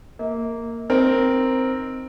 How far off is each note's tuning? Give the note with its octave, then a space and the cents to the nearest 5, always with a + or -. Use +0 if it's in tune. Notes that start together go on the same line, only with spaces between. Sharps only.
A#3 -10 E5 -45
C4 +0 D#4 -5 A#4 +0